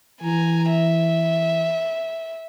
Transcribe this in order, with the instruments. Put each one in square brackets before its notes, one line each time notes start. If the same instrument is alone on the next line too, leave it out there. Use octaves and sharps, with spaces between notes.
[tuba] E3 [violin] G#5 A#5
[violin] E5